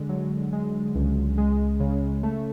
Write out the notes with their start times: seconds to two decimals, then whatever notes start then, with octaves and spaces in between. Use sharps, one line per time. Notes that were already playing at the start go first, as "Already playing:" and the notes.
Already playing: D3 G#3
0.09 F#3
0.53 G#3
0.95 C#2
1.38 G#3
1.80 C#3
2.23 A3